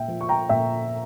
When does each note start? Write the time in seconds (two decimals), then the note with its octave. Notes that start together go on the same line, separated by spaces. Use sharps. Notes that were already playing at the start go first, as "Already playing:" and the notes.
Already playing: A#2 E5 G5
0.08 F3
0.21 C#6
0.29 G5 A#5
0.49 A#2 E5 G5